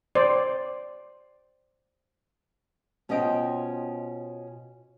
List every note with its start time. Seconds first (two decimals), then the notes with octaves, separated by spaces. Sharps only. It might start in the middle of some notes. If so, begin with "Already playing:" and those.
0.15 C5 D5
3.09 B2 C#4 F4 C5 D#5 G5